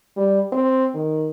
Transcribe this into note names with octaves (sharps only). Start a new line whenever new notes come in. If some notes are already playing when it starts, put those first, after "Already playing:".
G3
C4
D#3